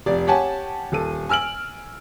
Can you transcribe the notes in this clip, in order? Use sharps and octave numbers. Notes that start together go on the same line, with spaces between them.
F1 D5
G4 C#5 F#5 G#5 A5
D#1 A4 D#7
G#5 E6 F6 D7 F#7